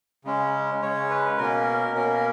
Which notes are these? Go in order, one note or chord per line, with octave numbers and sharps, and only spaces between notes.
C#3 G#3 C#4
C#3 G#3 C#4 C#5
B4
B2 A#3 C#4 A#4
B2 A#3 C#4 A#4